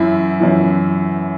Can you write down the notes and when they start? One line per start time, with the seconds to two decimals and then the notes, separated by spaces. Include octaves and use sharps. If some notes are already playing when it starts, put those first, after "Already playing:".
Already playing: F#2 E3 E4
0.40 F#2 E3